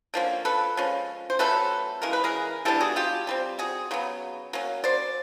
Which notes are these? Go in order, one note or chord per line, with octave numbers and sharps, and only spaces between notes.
D3 F3 A#3 C#4
A4 B4
F3 G#3 C#4
C5
F#3 A3 C#4 A4 B4
C#3 E3 G#3 A#4
B4
G#4 A#4
E3 G3 B3 D4 G4 A4
F#4 G#4
F4 G4
D3 G3 C4
F#4 G#4
C#3 F#3 B3
F#3 A#3 C#4
C5 D5